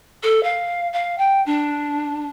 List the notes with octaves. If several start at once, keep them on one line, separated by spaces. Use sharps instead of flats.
A4
F5
F5
G5
D4